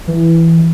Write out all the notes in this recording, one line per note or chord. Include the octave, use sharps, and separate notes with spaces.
E3